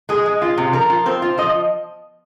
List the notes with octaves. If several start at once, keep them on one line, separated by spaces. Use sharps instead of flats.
G#3 G#4
G#3
F4
C3
F3 A#4
F4
C4 C5
F4
F3 D#5